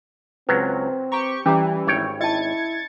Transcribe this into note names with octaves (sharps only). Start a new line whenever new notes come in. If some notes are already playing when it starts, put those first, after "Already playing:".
C#2 F#3 C4 B4
G4 A#5 C#6
E3 G3 C#4 G4 A#5
G#1 C#5 G5
E4 D#5 A5 G#6 A6 C#7